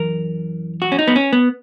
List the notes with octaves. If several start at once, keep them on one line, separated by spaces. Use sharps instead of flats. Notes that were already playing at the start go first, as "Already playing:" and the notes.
Already playing: F#2 E3 A#4
F#4
C#4
D#4
B3
C#4
B3